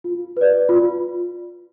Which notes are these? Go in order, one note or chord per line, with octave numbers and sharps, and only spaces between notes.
F4
B4 D5
F4